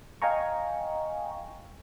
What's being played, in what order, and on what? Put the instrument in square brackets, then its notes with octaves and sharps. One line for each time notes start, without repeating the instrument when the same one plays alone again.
[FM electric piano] D#5 F5 G5 G#5 A#5 C#6